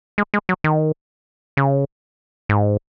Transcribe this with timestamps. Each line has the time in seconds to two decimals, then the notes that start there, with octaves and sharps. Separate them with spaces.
0.18 G#3
0.34 G#3
0.49 F#3
0.64 D#3
1.57 C#3
2.49 G#2